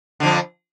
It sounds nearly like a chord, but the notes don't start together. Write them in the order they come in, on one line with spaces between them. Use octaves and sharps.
D3 F2 F3